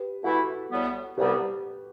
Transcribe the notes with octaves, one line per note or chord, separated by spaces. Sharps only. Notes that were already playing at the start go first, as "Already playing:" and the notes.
Already playing: G4 B4
E3 A3 E4 F#4 A4
A2 G3 B3
C2 C3 G3 B3 G4 B4